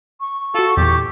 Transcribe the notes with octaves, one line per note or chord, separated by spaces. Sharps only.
C#6
F4 F#4 A4
E2 A#2 E3 G4